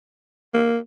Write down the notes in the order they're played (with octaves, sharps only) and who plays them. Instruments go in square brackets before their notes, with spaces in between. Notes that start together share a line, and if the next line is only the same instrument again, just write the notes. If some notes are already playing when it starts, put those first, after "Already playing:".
[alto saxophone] A#3